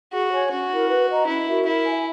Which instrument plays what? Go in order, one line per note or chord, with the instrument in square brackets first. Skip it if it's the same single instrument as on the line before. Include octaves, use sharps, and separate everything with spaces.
[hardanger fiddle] F#4 [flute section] G#4
[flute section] C#5 G#5
[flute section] C#4 [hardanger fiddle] F#4
[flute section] E4 A#4
B4
D#5 A#5
[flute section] C#4 [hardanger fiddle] E4
[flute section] F#4 A#4 E5
[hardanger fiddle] E4 [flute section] A#4
[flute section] E5 G#5